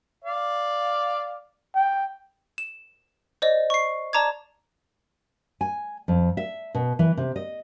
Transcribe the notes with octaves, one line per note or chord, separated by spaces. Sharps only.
D5 F5
G5
E7
C5 D5 D#5
C#6 C7
D5 A5 A#5 D6 G#6
G#5
F2
E5
B2
E3
C3
D#5